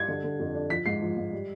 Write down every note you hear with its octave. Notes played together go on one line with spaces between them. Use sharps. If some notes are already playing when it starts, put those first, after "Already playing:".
Already playing: G3 G#6
D3
D3
F2
D4
F3 B6
G#2 C7
F3
G#2
G3